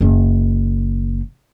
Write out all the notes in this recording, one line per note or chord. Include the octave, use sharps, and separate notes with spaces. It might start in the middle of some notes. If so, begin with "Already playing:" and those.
F#1 D#3